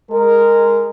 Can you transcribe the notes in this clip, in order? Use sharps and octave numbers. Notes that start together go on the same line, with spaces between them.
G#3 A#4